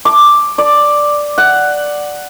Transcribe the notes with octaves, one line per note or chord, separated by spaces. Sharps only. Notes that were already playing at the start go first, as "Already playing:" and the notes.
D6
D5
F#5